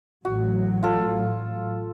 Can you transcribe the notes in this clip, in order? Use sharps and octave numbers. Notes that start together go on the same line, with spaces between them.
A1 A2 F#3 F#4
F4 A4